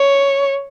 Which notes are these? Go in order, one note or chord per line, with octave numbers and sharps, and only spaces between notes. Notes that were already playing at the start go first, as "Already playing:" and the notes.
Already playing: C#5